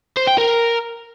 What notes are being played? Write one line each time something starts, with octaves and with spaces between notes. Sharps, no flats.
C5
G5
A#4